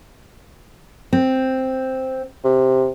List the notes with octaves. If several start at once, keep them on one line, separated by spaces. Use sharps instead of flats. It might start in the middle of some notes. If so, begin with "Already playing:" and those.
C4
C3